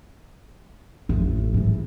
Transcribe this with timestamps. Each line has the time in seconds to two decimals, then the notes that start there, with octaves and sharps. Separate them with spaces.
1.09 A1 F2
1.54 G#2 E3